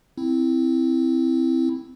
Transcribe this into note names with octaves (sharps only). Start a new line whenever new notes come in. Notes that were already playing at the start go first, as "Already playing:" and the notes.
C4 E4